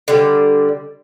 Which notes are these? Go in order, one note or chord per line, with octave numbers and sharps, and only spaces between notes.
D3 G3